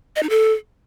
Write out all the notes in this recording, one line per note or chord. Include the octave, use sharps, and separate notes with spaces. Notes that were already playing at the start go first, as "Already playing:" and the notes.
D#5
D#4
A4